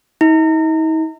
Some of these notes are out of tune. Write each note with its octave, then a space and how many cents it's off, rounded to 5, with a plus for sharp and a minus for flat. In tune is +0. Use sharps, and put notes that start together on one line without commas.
D#4 +45